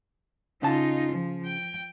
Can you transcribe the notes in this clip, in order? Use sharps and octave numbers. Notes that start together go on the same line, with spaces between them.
C#3 D#4 F4 A5
F3
G5